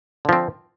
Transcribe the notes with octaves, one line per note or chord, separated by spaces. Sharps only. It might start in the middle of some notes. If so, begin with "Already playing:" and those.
D3 F3 C4